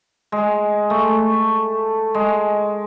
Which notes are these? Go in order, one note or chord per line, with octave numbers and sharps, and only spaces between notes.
G#3
A3
G#3